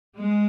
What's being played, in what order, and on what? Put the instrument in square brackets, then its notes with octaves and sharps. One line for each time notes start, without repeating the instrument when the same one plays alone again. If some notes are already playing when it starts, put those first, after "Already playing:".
[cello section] G#3